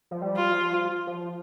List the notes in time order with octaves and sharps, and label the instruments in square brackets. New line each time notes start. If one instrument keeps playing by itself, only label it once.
[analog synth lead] F3
G3
[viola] F4
[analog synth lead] F3
F3